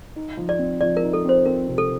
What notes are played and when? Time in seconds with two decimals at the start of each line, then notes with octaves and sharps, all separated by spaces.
0.16 D#4
0.37 F3
0.49 D5
0.59 C4
0.81 F3 D5
0.97 A#4
1.03 D#4
1.13 A4
1.25 C4 C5
1.45 C4 A#4
1.68 C3
1.78 A4